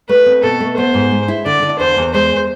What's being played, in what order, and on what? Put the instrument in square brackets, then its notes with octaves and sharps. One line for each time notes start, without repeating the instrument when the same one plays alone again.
[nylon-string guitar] A3 [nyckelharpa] B4
[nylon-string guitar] C4
[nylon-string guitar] B2 [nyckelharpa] A4
[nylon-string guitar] A3
[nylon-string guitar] B3 [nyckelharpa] C5
[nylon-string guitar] G#2
G#3
E4
[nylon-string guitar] D3 [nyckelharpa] D5
[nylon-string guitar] D3
[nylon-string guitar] E2 [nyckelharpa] C5
[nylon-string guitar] E2
[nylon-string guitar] G#3 [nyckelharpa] C5